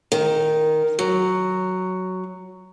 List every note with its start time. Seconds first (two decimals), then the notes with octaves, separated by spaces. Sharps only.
0.12 D#3
0.99 F#3